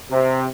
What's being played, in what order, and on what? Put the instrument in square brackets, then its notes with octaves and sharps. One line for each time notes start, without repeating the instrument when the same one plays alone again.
[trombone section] C3